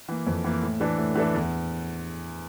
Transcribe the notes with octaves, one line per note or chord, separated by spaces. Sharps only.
E3 A#3
F2
E3 A#3
A2
E3 A3 D4 A4
A2
E3 A3 D4 A4
E2